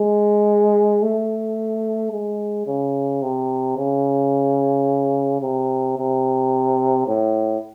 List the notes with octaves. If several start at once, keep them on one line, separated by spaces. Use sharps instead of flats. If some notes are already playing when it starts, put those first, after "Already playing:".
Already playing: G#3
A3
G#3
C#3
C3
C#3
C3
C3
A2